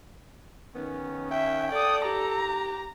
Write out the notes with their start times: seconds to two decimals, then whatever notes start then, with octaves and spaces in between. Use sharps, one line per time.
0.75 D#3 B3 C#4
1.31 E5 G5
1.72 A4 D5 D#6
2.05 G4 A#5